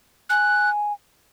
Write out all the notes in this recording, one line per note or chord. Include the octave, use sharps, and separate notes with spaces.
G#5 F#6